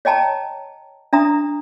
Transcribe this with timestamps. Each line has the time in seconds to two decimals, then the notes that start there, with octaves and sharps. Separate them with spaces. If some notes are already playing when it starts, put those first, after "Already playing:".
0.05 C#5 D#5 G5 A5 A#5
1.13 D4 E5 A#5 D#6